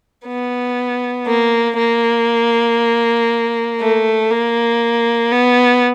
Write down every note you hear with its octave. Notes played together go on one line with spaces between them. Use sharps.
B3
A#3
A#3
A3
A#3
B3